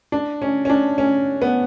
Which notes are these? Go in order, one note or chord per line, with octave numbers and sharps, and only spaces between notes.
D4
C#4
C#4
D4
C#4
B3